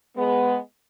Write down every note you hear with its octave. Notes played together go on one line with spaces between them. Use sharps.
G#3 B3